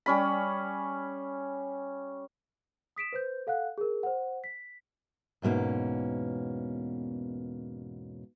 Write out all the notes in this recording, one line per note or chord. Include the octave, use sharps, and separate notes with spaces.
G3 C#4 B5
D#6 B6 D7 E7
B4 C5 G6
A4 F5 F#5 F#6
G#4 A#4
C5 F#5
B6
E2 G#2 B2 A#3 C#4